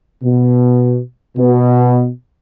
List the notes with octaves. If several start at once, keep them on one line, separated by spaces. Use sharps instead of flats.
B2
B2